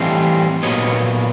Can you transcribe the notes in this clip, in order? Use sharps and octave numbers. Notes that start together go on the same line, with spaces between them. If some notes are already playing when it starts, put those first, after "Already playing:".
Already playing: A2 E3 G3 C4 D#5 F5
A#2 F#3 B3 C#5 D#5